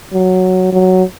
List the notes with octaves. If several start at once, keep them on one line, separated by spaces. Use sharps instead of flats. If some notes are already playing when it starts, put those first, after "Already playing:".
F#3
F#3